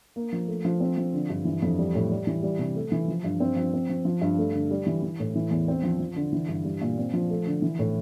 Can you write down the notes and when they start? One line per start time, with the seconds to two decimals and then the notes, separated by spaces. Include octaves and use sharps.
0.16 A#3
0.33 F3
0.48 A3
0.65 F3
0.80 C4
0.98 F3
1.14 D3
1.30 G2
1.45 E3
1.62 F2
1.79 G3
1.95 A2
2.11 G3
2.27 E3
2.43 G3
2.59 C3
2.76 A3
2.92 E3
3.08 F3
3.24 G2
3.40 C4
3.56 F3
3.74 C4
3.89 F3
4.05 F3
4.22 G2
4.38 A3
4.54 D3
4.71 G3
4.86 E3
5.02 E3
5.20 A2
5.35 E3
5.51 E2
5.68 C4
5.83 F3
6.00 F3
6.16 D3
6.33 E3
6.49 G2
6.65 G3
6.81 A#2
6.97 C4
7.14 F3
7.30 A3
7.47 D3
7.62 E3
7.79 A2